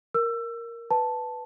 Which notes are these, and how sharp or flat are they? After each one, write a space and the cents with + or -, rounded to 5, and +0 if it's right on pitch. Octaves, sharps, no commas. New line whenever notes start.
A#4 +0 E6 +25
B4 +0 A5 +0